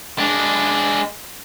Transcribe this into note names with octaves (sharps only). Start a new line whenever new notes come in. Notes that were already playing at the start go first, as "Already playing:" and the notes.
G#3 D4